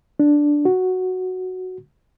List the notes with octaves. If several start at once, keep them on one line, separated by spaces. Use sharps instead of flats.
D4
F#4